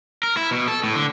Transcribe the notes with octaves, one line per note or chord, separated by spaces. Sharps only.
A#4
E4
B2
A4
A2
D3